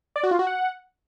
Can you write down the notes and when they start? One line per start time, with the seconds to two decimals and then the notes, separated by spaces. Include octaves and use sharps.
0.16 D5
0.23 F#4
0.31 F4
0.39 F#4
0.47 F#5